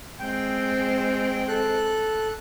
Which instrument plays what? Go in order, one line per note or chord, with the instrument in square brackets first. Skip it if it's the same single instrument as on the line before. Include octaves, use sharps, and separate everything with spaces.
[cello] G#3 C4 [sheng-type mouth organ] G5
[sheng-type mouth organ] A4 F#6